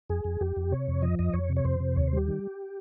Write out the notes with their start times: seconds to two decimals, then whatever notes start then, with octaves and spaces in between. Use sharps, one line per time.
0.10 F2 G#4
0.24 F2
0.41 F2 G4
0.56 F2
0.71 C3 C#5
0.88 F2
1.02 F3 D#5
1.19 F2 D#5
1.33 F2 C#5
1.49 C3
1.56 C#5
1.65 F2 C5
1.80 C3
1.96 D#2 C#5
2.07 C5
2.13 G3 G4
2.28 D#3